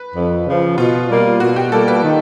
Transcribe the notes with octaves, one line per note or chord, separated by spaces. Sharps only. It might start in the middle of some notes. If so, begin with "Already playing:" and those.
Already playing: B4
F2
C#3 F3
B2 F4
G3 A#3
B2 F#4
G4
G3 A#3 A4
B4
D#3